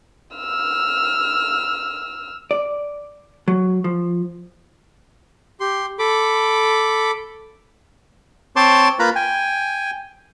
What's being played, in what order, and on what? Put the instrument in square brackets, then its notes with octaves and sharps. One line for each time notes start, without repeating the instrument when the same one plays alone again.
[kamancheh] E6 F6
[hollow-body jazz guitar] D5
F#3
F3
[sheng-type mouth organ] G4 C6
A4 B5 D6
[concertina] C4 C5 C#5 A5 C6 D6
A#3 F4 B4 A#5 B5
G5 G#5